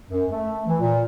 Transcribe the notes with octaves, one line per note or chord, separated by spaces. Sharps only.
F#2
A3
E3
A#2